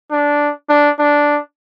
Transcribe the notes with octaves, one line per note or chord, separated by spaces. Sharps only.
D4
D4
D4